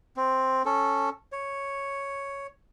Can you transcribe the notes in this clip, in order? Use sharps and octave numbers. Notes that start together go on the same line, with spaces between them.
C4
C#4 A4
C#5